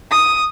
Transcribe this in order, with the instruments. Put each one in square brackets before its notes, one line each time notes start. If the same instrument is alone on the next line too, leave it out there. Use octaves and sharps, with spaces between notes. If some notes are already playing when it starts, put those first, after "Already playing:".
[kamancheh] D#6